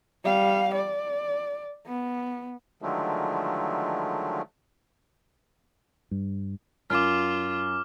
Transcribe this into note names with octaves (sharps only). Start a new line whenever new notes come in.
G3 F5
D5
B3
D3 D#3 F3 F#3 G#3 A3
G2
F#2 F4 D6 F6